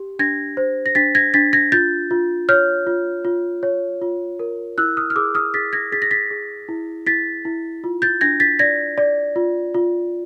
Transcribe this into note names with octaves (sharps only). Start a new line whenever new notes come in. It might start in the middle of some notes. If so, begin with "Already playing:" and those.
Already playing: G4
D4 G#6 A#6
C5
A#6
D4 A6 B6
G#6 A#6
D4 A6 B6
G#6 A#6
F4 G6 A6
F4
C#5 F6 G6
F4
F4
C#5
F4
A#4
E4 E6 F#6
D#6 F6
F6
G#4 D6 E6
D#6 F6
G#4 A6 B6
G#6 A#6
G#4 A6 B6
A#6
A6 B6
G#4
E4
E4 A6 B6
E4
F4
G6 A6
D4 G#6 A#6
A6 B6
D5 G#6 A#6
D5
F4
F4